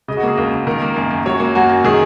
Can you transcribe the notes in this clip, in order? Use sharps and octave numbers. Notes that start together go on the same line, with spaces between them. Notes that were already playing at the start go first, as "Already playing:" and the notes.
C#3 D#5
F#4
A#3 G#4
C#2 A#4
C#2
D#3 A#4
A#3
F#2
F#2
F#3 C#5
A#3
F#2 F#4
F#2
D#3 G#4